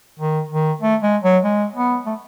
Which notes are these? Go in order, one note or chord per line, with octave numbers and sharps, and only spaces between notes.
D#3
D#3
A3
G#3
F#3
G#3
B3
A3